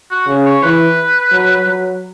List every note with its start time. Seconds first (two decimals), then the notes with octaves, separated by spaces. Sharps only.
0.11 F#4
0.28 C#3
0.46 C#5
0.63 E3 B4
1.32 F#3
1.66 F#3